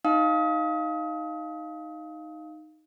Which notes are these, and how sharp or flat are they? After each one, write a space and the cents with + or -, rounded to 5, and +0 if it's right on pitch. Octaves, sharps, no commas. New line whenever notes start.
D#4 +0 F5 +0 D#6 +30